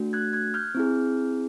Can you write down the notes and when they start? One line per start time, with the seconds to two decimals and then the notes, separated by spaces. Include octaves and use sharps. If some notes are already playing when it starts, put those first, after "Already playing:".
Already playing: A3 D4 F#4
0.13 F#6 G#6
0.33 F#6 G#6
0.54 F6 G6
0.75 C4 E4 G#4